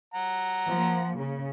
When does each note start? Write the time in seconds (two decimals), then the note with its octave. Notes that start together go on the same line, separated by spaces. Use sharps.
0.14 F#5 A#5
0.67 F3 A#3
1.18 C#3